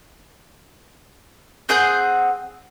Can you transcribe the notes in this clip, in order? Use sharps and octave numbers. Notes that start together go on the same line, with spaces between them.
C4 G#4 F#5 G6